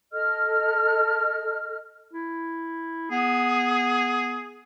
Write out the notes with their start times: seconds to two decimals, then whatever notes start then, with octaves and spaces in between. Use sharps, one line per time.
0.12 A4 D#5 F6
2.12 E4
3.11 B3 G#4